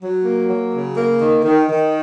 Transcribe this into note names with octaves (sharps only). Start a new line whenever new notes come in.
F#3
A#3
F#3
C#3
A#3
D#3
D#3
D#3